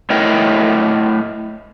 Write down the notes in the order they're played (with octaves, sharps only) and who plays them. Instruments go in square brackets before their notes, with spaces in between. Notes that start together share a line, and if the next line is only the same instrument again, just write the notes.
[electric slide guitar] A3 E4 A#4 C#5 D#5 G5